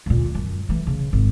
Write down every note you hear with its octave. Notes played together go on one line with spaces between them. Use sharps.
D2 A#2
F#2
E3 A3
C#3
G#1